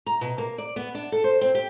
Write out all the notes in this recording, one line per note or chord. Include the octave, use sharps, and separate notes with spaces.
A#5
B2
A#3
D5
B3
D4
A4
C5
C4
G4